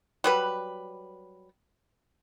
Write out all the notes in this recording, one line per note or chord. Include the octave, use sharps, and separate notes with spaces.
F#3 G3 B4